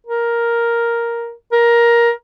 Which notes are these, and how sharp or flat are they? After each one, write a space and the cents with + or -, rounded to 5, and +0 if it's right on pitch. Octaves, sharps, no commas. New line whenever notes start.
A#4 +5
A#4 +15